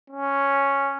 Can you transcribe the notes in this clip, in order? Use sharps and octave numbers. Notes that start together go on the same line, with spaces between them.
C#4